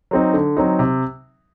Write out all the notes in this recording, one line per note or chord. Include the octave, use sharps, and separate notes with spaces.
F#3 C4 D#4
D3
F#3 C4 D#4
C3